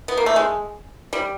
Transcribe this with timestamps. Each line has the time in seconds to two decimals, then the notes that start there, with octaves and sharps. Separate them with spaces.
0.08 B3
0.17 A#3
0.26 A3
0.36 G#3
1.13 G3